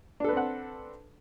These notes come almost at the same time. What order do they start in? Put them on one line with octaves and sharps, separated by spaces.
D4 A4 B4 C4 F#5